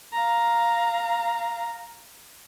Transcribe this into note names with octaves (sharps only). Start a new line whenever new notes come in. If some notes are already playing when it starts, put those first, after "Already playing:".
F5 A#5